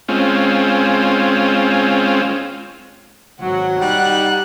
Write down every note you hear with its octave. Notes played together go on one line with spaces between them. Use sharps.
G#3 C4 C#4 F4
G#1 F#3 F#5
G3 D#4 F#6